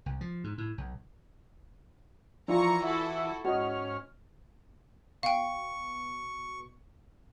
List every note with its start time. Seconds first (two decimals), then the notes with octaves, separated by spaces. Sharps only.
0.06 C2
0.21 F3
0.44 G#2
0.58 A2
0.78 B1
2.48 E3 F3 D4 F4 A#5 C#6
2.83 E4 F#4 A4 E5
3.45 G#2 C#4 F#4 D#5 F6
5.23 B2 F5 G5 C#6